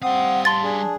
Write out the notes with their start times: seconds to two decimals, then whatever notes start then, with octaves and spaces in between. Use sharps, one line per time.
0.02 G3 C4 F5 F#5 D#6
0.45 A5 C6 A6
0.63 D4 G#4